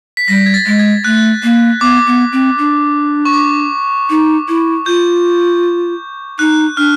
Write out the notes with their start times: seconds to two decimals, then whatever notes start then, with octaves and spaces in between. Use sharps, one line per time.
0.17 B6
0.28 G3 A#6
0.46 G#6
0.54 A6
0.66 G#3
0.79 G#6
1.05 A3 F#6
1.43 A#3
1.81 B3 D6
2.07 B3
2.32 C4
2.58 D4
3.25 C#6
3.33 D6
4.10 D#4
4.48 E4
4.86 F4 G6
6.39 D#4 F#6
6.77 D4 F6